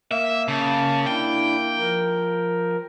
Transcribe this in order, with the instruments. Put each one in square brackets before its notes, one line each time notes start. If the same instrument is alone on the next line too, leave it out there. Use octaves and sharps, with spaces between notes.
[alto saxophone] A#3 [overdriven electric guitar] E5
[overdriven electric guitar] C#3 [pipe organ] A5
[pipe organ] D4 E4 [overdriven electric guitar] G5
[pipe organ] F3 A#4